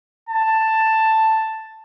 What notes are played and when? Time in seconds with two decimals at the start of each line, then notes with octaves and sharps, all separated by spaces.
0.29 A5